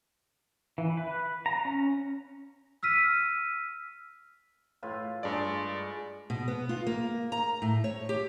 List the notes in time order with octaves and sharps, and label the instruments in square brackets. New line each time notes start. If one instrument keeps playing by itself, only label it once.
[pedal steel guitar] E3
B4
A#5
C#4
[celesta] E6 F6 B6 D#7
[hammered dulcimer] A2 F4 B4
[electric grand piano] G2 D5 [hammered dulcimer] G#3
[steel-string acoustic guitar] B2
B3
F4
A#3
A#5
A2
C#5
G4